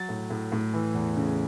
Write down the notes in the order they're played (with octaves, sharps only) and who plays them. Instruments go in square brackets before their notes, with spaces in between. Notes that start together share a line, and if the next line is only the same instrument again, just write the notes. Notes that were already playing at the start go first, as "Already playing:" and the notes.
Already playing: [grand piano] F#3 A6
A2
A2
A2
E3
E2
C#3